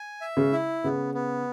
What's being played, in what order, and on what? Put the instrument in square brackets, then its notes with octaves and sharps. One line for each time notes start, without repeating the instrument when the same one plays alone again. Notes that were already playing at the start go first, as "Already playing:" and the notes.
Already playing: [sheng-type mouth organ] G#5
E5
[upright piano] C#3
[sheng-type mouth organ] E4
[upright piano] C#3 [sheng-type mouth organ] B3
[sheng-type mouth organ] B3